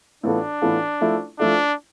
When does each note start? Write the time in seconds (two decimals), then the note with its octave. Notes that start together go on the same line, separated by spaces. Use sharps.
0.23 A2 E3 B3 D4 F4 A4
0.62 A2 E3 B3 F4 A4
1.01 F3 A3 E4 A4
1.39 F3 A3 D4 E4 A4